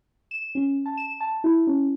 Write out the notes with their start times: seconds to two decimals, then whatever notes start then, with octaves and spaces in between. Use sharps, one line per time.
0.31 E7
0.55 C#4
0.86 A5
0.97 E7
1.20 A5
1.44 E4
1.67 C#4